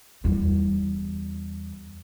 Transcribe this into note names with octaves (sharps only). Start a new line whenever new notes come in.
E2 G3